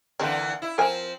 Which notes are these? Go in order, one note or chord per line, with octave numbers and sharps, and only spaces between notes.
D3 E3 A#3 C4 D4
E4
F3 C4 A#4 G#5